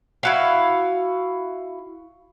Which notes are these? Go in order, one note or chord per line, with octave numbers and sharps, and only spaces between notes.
E4 F#4 F5